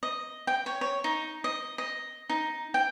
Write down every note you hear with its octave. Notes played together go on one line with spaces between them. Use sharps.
D#5
G5
C#5
C#5
D#4
D#5
D#5
D#4
G5